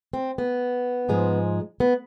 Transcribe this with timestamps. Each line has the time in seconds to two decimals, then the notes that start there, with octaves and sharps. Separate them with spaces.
0.13 C4
0.38 B3
1.09 G#2 F3 G#3
1.80 B3